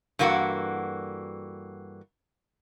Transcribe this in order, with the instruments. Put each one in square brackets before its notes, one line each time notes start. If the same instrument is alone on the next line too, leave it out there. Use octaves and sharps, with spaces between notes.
[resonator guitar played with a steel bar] G2 E3 A#3 F#4 A4 F#5